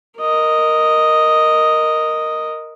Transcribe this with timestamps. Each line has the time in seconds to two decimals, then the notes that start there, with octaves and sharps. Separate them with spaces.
0.19 A#4 D#5